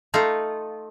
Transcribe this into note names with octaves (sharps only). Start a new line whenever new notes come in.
A3 D#4 F4